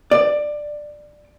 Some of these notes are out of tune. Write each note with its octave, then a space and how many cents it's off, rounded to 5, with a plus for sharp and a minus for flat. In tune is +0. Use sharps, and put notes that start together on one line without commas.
D5 +15